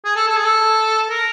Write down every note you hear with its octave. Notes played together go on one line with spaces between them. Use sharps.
G#4
A4
A4
G#4
A4
A#4